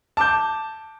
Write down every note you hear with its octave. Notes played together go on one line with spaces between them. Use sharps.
A5 D6 G6